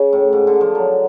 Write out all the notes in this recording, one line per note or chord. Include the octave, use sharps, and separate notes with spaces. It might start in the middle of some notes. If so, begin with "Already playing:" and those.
Already playing: C#3
A2
G#2
D3
F3
F#3